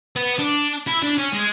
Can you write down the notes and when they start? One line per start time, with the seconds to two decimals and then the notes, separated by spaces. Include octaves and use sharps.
0.16 B3
0.39 D4
0.87 E4
1.02 D4
1.18 C#4
1.33 G#3